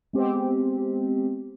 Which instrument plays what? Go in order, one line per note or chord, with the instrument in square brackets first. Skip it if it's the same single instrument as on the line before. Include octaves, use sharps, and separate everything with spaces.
[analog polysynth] G#3 B3 C4 G4